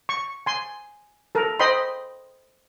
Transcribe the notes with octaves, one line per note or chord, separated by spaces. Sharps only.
C#6
G#5 C6
A4 A#4
C5 D#5 G5 B5 C6